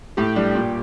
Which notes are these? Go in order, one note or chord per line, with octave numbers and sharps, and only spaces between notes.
A2 G4
G3 D4
A#2